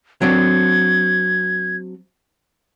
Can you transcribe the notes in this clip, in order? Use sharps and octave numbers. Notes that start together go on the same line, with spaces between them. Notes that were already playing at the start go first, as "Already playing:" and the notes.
F#3 C4 D4 G#6